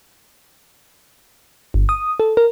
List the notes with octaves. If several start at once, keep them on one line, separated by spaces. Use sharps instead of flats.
G1
D#6
A4
A#4